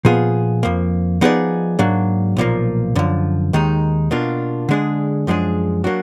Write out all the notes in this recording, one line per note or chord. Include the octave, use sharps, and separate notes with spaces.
A#2 F3 B3 F4 G#4
F2 F3 A#3
F3 B3 D#4 G#4 D5
G#2 F#3 A#3 D4
B1 A#2 F3 A#3
F#2 D3 F3
D#2 D#3 G#3 D#4
B2 A#3 D4 F4
D3 G#3 D4 G#4
F#2 F3 G#3 D4 G#4
F#3 A#3 D4 F#4